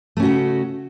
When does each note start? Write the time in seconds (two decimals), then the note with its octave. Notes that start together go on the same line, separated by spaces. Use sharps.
0.17 A3
0.20 C#4
0.22 F#4
0.25 C#3